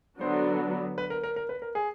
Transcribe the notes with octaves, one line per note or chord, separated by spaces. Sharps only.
D3 F#3 B3 D4 F#4 C5
B4
A#4
A#4
A#4
B4
A#4
G#4